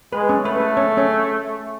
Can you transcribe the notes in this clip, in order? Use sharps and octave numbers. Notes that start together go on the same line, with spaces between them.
G#3 B4
C#4 C#5
A3 B4
A4
C#4 C#5
C#4 C#5